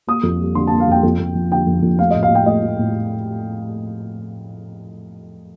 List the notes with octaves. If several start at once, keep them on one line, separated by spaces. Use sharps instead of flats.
A#3 D#6
F2
G3
D3 C6
A5
A#3
F5
F2 G5
F2
F2
F3
D3 G5
F2
F2
A3 F5
D#5
A2
F5
A2 G5
A3 D#5
A3
A2